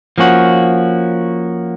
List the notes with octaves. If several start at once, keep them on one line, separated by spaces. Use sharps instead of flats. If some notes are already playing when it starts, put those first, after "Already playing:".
F3 A#3 C#4 F#4